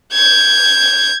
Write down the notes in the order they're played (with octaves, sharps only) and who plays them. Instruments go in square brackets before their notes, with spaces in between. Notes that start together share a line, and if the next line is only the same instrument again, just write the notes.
[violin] G6 G#6